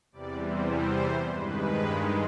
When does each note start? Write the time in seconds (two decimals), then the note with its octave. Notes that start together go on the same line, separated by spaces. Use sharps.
0.12 E2 C3 E3 G3 D5
0.42 C5
0.71 C5
1.29 G2 D#3 G#3 B4